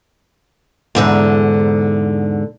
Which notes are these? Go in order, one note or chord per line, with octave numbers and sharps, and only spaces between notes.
E2 G#2 D3